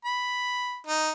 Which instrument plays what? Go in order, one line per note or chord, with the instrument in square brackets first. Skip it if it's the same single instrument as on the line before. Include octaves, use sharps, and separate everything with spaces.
[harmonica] B5
D#4